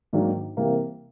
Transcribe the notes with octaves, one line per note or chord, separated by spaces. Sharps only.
G#2 D#3 F#3 A#3 D4
C3 E3 G3 A#3